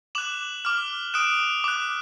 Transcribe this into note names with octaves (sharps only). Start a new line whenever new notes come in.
D6 F#6 E7 F#7
D6 F6
D#6 F#6 D7 E7
D6 F#6